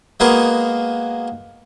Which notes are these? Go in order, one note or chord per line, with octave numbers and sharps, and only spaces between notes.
G#3 A#3 B3 F#4 G#4 A#4